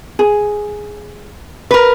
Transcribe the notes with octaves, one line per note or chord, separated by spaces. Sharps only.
G#4
A#4 B4